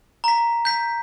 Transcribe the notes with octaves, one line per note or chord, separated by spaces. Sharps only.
A#5 B6
G6 B6